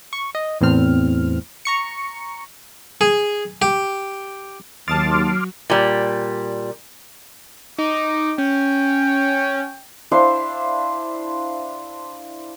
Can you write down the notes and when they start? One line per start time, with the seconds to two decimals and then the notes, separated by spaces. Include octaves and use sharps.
0.13 C#6
0.35 D#5
0.61 E2 A2 C4 F6
1.65 A#5 C#6 C#7
3.01 G#4
3.62 G4
4.88 D#2 F#3 A5 C6 D6 D#6 F6 A6
5.70 A#2 G3
7.78 D#4 D6
8.38 C#4 G5
10.12 D4 E4 C5 F5